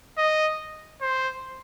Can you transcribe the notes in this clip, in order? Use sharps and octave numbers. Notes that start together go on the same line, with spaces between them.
D#5
C5